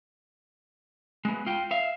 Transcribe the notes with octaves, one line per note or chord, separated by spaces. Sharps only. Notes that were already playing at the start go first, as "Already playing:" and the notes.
G#3 B3
F4 G5
E5 F5